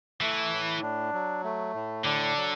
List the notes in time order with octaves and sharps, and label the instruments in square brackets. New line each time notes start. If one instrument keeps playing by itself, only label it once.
[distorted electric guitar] E3 [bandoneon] A3
[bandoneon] A2
D4
F#3
A3
A2
[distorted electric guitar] D3 [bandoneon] D4
[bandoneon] F#3